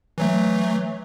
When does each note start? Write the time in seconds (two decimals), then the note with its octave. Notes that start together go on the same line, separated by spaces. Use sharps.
0.18 E3 F#3 A3